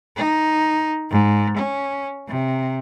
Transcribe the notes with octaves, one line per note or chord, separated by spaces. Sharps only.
D#4
G#2
C#4
C3